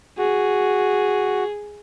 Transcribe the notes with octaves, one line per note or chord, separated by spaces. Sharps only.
F#4 G#4